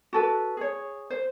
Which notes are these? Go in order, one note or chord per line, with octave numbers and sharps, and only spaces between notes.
F#4 A4 B4
G#4 C#5
C5